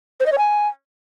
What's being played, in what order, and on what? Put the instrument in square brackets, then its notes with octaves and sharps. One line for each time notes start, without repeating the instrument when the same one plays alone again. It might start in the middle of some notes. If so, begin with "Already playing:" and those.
[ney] C5
D#5
C#5
G#5